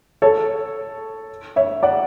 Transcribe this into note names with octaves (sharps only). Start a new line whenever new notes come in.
A4 C#5
C#5 E5
D5 F#5